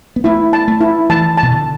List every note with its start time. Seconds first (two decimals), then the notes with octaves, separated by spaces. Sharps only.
0.16 B3
0.24 A3 E4
0.53 A5
0.68 A3
0.81 E4
1.09 E3 A5
1.37 A5
1.43 B2
1.52 D3